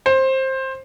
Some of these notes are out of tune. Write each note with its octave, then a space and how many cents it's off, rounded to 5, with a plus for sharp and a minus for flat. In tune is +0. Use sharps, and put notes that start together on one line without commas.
C5 +15